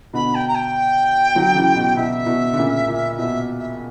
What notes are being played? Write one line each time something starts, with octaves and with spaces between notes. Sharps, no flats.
B2 D3 B5
G5
A#5
G5
D3 F#3
C#3 E3
B2
B2 E5
B2
D3
A#2 C#3
A#2
B2 E5
E5